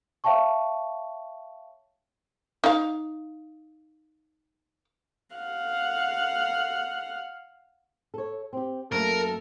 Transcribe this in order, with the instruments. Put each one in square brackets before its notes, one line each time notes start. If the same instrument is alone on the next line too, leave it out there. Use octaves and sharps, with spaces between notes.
[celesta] C#5 E5 F5 G5 A5 C#6
[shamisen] D#4 F5
[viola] F5 F#5
[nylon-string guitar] A4 C#5
C4 G4
[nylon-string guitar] F#2 A3 A#3 [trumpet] A4 [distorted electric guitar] A#4